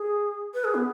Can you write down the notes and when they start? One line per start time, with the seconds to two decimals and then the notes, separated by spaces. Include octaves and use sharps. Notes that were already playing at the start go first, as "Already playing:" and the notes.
Already playing: G#4
0.54 B4
0.64 G#4
0.75 B3